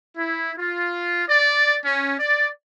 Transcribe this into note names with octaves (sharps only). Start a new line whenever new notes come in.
E4
F4
D5
C#4
D5